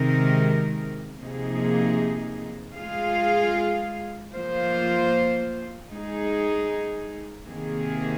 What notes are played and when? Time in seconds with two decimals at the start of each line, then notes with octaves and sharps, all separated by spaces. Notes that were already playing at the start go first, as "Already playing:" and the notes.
Already playing: C3 D#3 G#3 D#4 A#4
1.19 C3 F3 A#3 D#4 G#4
2.76 G#3 F4 G#4 F5
4.33 F3 A#3 F4 C5
5.89 G#3 D#4 G#4
7.46 C3 D#3 A#3 G#4